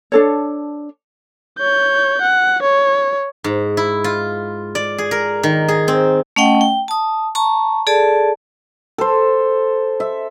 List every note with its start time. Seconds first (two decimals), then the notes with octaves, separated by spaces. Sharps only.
0.12 D4 A4 C#5
1.58 C#5 G6
2.22 F#5
2.63 C#5
3.44 G#2
3.77 E4
4.04 F4
4.75 D5
4.98 G#4
5.11 A#4
5.43 D#3
5.68 G#4
5.88 C4
6.36 A3 C#4 D#5 F#5 G5
6.61 G5
6.88 A5 D#6
7.35 A5 A#5 C#6
7.87 G#4 A4 D5 A5
8.98 A4 C5
10.00 E5